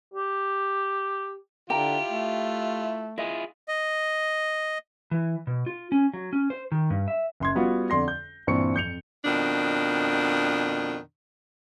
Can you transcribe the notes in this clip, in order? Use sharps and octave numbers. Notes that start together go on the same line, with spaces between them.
G4
D3 E4 F4 G4 G5 A#5
A3
E4 F4 G#4 D#5
D#5
E3
B2
F4
C#4
F#3
C#4
C5
D#3
G2
E5
F#1 C6 G#6
G3 B3 F4 F#4
F2 D3 D5 C6 A#6
G6
G2 A#2 E3 C4 C#6 C#7
F2 G6 C#7 F7
F2 B2 D#3 D4